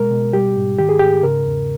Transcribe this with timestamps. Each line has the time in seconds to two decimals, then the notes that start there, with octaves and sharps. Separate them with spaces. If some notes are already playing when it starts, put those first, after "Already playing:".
Already playing: B2 G#3 A#4
0.11 B2
0.33 G3 G4
0.57 G#2
0.78 D#3 G4
0.89 G#4
0.99 G#2 G4
1.23 C#3 A#4
1.45 E2